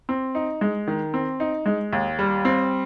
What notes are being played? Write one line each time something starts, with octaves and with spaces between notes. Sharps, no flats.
C4
D#4
G#3
D#3
C4
D#4
G#3
D#2
G3
C4